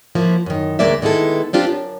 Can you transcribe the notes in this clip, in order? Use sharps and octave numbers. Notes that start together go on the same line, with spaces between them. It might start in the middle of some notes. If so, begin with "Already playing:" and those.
F3 A#3 E4 F#4
F#2 D#3
D2 A#2 G#3 A#3 D5 E5
D#3 G#3 B3 E4 A4
C4 D4 F4 G4
F#2